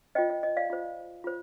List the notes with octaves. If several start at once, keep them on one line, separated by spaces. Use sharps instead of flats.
F4 C5 D#5 G5
D#5
D#5
D5 F5
F4 C5
F4 C5